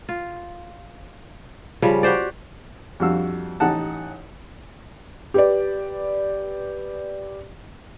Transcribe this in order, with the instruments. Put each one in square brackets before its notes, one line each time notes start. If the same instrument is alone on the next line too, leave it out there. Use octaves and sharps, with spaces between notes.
[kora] F4
C#3 F3 G3
F#4 G4 C5 D5
[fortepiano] F2 G3 D4 F#4 F5 E6
A1 D#4 G4 F#5 A5
[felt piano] G4 B4 D5